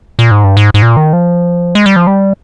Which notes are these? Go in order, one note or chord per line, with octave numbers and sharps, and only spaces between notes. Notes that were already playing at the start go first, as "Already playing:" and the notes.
A#2
G#2
G2
G#2
G#2
A#2
D#3
F3
G#3
G3
F3
G3